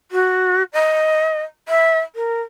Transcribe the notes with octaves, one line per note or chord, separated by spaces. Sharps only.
F#4
D#5
E5
A#4